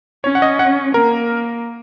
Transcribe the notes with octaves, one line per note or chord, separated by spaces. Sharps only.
C#4 C#5
F#5
D#5
F#5
A#3 A#4